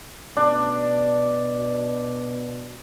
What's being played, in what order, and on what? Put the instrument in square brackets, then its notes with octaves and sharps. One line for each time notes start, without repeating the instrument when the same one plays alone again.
[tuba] B2 [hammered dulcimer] D4